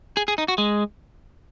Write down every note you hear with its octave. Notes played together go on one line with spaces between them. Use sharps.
G#4
G#4
D#4
F#4
G#3